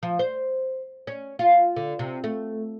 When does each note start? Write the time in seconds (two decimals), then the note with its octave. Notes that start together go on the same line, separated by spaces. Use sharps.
0.03 F3
0.19 C5
1.07 C#4
1.39 F4
1.76 D3
1.99 C3
2.24 A3